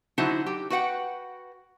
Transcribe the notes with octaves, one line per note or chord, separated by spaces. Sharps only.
D3 F#3 D#4 E4 F#4 C5
G4
F#4 B4 F#5 G5